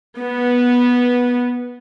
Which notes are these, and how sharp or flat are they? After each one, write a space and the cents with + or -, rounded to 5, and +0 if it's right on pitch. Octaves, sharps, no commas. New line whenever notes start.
B3 -10